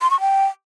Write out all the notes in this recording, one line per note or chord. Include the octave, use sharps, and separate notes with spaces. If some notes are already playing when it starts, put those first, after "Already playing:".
C6
C#6
G5